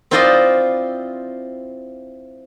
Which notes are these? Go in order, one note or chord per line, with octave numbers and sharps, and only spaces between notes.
C4 E4 F4 C5 D5 D#5